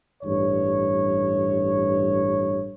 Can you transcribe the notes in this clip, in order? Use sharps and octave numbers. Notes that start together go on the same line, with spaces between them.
A1 G2 C#5